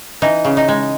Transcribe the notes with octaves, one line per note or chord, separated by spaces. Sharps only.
E3 D#4
C#3
D#4
G#3